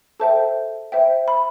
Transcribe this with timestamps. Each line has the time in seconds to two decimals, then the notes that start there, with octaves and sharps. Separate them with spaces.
0.20 A4 C5 E5 G5 A5
0.92 C5 E5 G5
1.28 B5